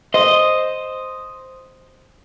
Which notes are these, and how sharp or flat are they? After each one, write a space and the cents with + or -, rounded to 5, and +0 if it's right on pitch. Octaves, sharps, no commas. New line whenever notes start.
C5 +0 D#5 +0